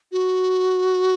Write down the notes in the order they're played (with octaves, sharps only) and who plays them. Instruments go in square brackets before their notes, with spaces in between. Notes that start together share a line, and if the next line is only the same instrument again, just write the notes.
[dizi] F#4